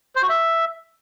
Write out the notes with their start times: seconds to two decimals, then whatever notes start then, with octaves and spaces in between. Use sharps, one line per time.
0.15 C5
0.22 F#4
0.29 E5